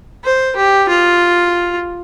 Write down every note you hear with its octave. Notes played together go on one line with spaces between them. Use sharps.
C5
G4
F4